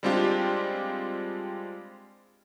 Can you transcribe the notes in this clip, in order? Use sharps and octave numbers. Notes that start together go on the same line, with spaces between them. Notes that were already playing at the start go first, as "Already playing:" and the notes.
G3 G#3 C4 D4 F4 G4